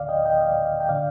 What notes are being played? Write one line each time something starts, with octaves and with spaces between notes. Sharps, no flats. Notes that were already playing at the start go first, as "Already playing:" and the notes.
Already playing: D2 D3 D5 F5
D#5 G5
D#5 G5
D5 F5
G5
D3 D5 F5